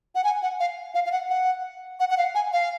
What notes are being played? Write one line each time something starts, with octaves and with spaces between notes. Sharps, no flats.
F#5
G#5
F#5
F5
F5
F5
F#5
F#5
F#5
F#5
F5
G#5
F5